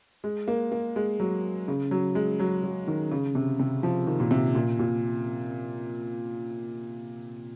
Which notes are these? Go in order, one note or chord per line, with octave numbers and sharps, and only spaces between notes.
G#3
A#3
A#3
G#3
F#3
C#3
F#3
G#3
F#3
F#3
D#3
C#3
C3
C3
F3
D#3
A#2
C3
A#2
A#2